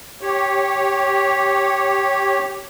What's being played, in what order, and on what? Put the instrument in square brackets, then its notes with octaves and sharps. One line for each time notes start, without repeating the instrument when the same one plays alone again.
[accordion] G4 C#5